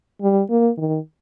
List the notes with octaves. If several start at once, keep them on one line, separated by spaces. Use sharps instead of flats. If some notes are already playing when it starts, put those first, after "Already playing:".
G3
A#3
D#3